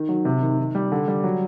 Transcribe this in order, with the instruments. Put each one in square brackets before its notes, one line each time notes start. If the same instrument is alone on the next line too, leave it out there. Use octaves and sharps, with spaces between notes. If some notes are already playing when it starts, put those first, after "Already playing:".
Already playing: [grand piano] D#3
F#3
C3
D#3
D#3
G3
D3
G3
F#3